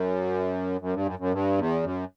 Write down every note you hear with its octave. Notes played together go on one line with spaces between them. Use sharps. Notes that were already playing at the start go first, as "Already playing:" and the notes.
Already playing: F#2
F#2
G2
F#2
F#2
G2
E2
F#2